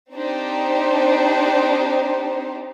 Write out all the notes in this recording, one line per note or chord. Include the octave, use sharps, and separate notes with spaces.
C4 D4 D#4 G4 C5